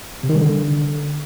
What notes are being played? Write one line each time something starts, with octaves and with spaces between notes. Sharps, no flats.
C3
D#3
G3
D3